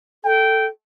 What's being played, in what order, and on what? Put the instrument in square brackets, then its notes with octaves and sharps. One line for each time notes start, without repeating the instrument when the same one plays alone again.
[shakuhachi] A4 [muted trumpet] G5